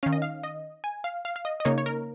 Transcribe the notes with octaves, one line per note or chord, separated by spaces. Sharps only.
D#3 C#4 F5
D#5
F5
D#5
G#5
F5
F5
F5
D#5
D#5
C#3 A#3 D#4 C#5
C#5
A#4